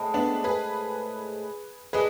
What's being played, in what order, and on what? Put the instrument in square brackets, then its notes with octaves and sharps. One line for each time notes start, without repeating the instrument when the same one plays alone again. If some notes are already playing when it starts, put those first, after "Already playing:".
Already playing: [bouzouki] A2 G#3 C4
[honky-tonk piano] B3 D4
G#4 B4
[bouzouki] G#3 D4 [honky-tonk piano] G#4 B4